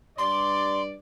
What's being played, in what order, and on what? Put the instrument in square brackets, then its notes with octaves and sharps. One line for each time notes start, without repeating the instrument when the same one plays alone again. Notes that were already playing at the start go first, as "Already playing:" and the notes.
[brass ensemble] G2 D5 [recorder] C6